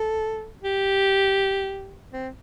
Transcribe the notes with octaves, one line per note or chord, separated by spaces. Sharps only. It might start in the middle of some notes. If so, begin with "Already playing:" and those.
Already playing: A4
G4
C4